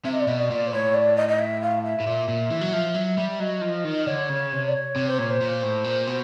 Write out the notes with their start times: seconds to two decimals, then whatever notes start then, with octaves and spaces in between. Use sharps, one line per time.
0.05 C3 E5
0.13 D#5
0.20 D5
0.27 B2 D#5
0.39 D5
0.50 A#2
0.67 C5
0.72 A2 C#5
0.94 D5
1.17 D#5
1.28 D#5
1.39 E5
1.61 F5
1.84 E5
2.00 A2
2.06 A#2
2.28 A#2
2.51 E3
2.61 F#3
2.73 F3
2.94 F#3
3.18 G3
3.40 F#3 D#5
3.62 F3
3.84 D#3
4.07 D3 C#5
4.29 C#3
4.52 C3
4.69 D5
4.74 C#5
4.96 C3
5.08 C5
5.18 A#2 C#5
5.30 C5
5.41 A#2
5.63 A2
5.85 A#2
6.07 B2